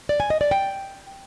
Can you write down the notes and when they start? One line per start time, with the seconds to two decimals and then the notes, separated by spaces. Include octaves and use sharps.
0.09 D5
0.20 G#5
0.30 D#5
0.41 D5
0.51 G5